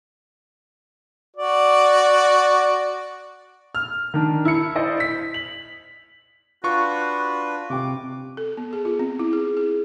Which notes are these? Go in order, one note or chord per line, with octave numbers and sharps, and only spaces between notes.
F#4 D5
F6
D#3 D4
E4 C#7
E4 C5 D5 D#5
B6
F#7
D4 F4 F#4 B4 C#6
C3 G5 D6
A4
B3
G#4
F4
C4
E4
G#4
G#4